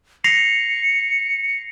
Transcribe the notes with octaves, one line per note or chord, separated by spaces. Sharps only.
A#6 C7 C#7 F7